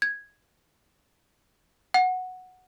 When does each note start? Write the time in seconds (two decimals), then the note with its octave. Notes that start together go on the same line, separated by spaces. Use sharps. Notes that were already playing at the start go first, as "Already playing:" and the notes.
0.02 G#6
1.94 F#5